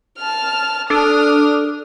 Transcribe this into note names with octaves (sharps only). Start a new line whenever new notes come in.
A5 F6
D4 A4 D#6 F6